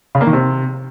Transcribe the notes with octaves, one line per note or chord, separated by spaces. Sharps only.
C#3
A#3
D#3
C3